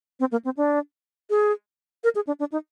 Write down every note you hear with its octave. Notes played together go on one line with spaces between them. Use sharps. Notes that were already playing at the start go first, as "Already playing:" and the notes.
C4
A#3
C4
D4
G#4
A#4
G#4
D4
D4
D#4